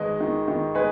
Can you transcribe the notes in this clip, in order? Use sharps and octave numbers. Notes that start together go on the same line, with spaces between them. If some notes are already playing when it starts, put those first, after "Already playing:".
Already playing: G#1 G#3 B4 D#5
D#3
D#3
G#3 G#4 B4